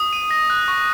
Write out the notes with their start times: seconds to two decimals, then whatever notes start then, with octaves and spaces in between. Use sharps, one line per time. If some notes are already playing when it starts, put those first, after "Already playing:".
Already playing: D#6
0.13 D#7
0.31 A#6
0.50 F#6
0.68 C#6